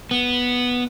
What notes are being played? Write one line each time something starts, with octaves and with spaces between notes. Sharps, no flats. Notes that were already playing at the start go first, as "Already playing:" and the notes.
B3